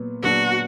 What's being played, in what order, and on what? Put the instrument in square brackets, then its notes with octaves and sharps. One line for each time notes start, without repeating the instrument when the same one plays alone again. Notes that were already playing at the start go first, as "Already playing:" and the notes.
Already playing: [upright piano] A#2 F#3 B3
[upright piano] A#2 F#3 B3 D4 [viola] F#4